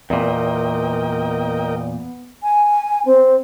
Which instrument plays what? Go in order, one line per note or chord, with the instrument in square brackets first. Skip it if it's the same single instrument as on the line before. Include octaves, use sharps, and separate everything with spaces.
[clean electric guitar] E2 A#2 [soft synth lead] B3 [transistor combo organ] A#4 D#5 G5
[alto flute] G#5
C4